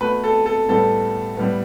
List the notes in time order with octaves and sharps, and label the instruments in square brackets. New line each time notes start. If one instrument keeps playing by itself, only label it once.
[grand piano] B2 A3 B4
A4
A4
A2 G3 B3 A4
A2 G3 B3